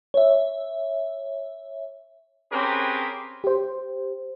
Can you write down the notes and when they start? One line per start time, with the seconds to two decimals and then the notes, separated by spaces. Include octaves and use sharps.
0.14 C#5 E5
2.52 C4 C#4 G4 G#4 A#4 B4
3.44 G4 C5